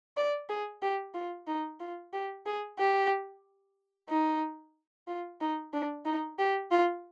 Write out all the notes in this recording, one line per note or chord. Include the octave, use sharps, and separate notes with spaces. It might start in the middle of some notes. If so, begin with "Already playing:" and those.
D5
G#4
G4
F4
D#4
F4
G4
G#4
G4
D#4
F4
D#4
D4
D#4
G4
F4